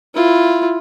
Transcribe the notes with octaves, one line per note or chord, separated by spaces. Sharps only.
E4 F4